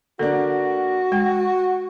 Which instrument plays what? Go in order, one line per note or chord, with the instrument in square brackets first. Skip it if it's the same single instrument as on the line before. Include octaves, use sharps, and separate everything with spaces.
[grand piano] D3 A#3 D4 [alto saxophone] F#4 [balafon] A4
[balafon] G#3 [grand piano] G5